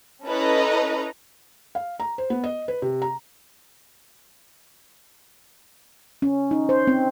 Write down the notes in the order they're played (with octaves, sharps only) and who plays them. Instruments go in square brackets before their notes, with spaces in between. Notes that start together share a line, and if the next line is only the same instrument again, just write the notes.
[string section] C#4 E4 A4 B4 D#5 A#5
[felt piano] F5
A#5
C5
B3
D#5
B4
C3
A#5
[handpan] C#4
D#4
C5
C4